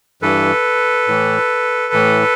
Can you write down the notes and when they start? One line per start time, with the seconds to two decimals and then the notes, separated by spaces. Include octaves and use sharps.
0.22 G2 E3 A4 B4
1.08 A2 E3
1.93 A2 E3